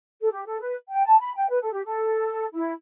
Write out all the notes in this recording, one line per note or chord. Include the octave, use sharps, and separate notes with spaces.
A4
G4
A4
B4
G5
A5
B5
G5
B4
A4
G4
A4
E4